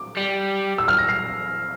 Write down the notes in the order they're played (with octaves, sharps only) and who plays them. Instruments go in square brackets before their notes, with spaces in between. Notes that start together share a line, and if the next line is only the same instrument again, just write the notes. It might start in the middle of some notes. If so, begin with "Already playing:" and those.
Already playing: [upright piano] D6
[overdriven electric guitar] G3
[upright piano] E6
F6
A#6
C7